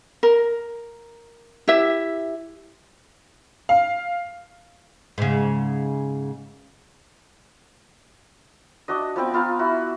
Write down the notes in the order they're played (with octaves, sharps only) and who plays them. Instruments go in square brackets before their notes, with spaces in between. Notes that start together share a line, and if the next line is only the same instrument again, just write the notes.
[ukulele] A#4
E4 G4 E5
[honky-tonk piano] F5
[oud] G#2 C#3
[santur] D4 F#4 D#5
F3 B3 C4 G5
B3 F4 F5 A#5
E4 F#4